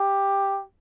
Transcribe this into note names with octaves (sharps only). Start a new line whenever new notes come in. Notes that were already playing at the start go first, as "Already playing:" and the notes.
Already playing: G4